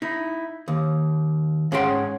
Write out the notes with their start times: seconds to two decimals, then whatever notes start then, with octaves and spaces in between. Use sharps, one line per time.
0.02 D#4 E4
0.68 D#2
1.72 G#2 C#4 G#4 F#5 G5 C6